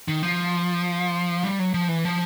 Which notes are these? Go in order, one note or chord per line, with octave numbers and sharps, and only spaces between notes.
D#3
F3
G3
F#3
F3
E3
F3